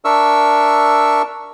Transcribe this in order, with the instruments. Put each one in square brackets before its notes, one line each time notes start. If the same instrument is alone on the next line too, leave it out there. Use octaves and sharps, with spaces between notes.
[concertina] D4 A#4 E5 C#6 E6